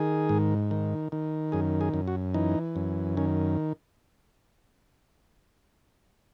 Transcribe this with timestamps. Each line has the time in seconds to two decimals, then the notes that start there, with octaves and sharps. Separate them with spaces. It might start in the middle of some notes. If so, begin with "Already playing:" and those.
Already playing: D#3 G#4
0.29 G#2
0.71 D#3
1.12 D#3
1.52 F#2 G#4
1.81 G#4
1.94 F#2
2.07 F#4
2.34 E3 D#4
2.76 F#2
3.17 D#3 C#4